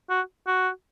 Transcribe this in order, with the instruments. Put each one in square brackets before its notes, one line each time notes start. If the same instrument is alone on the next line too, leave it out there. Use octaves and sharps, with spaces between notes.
[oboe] F#4
F#4